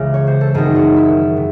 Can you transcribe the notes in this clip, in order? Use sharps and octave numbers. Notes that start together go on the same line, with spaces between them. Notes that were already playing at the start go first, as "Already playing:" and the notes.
Already playing: C#2 C#3 E3
C#5
C5
A4
F#2 D#3 A3 C4 D#4 G#4
F#4
E4
C3